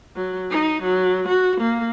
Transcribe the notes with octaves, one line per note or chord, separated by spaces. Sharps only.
F#3
D#4
F#3
F#4
A#3